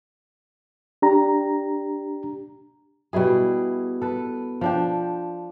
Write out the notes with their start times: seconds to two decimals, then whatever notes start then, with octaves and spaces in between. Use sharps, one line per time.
1.02 D4 G4 A#5
3.13 B2 G3 E4 G#4
4.02 A4 B4
4.61 F3 D4 G5